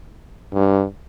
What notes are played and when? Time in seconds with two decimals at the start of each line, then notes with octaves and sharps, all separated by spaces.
0.53 G2